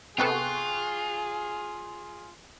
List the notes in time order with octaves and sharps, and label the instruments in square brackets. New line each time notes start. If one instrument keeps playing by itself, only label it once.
[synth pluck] C3 B3 A4 [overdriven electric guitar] F4 [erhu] G#4 [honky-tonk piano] G5 C#6 F#6